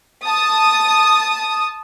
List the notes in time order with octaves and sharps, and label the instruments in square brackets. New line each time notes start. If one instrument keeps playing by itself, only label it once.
[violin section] A5 D#6